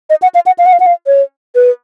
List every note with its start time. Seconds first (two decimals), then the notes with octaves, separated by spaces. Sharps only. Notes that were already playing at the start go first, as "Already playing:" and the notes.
0.10 D#5
0.22 F#5
0.35 F5
0.46 F#5
0.58 F5
0.66 F#5
0.73 F5
0.80 F#5
0.86 F5
1.07 C#5
1.55 B4